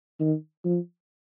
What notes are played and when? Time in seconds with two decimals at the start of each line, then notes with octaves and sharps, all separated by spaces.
0.20 D#3
0.65 F3